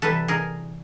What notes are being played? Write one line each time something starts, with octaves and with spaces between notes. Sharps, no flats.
C3 E3 G3 A4 B4
G#4 A#4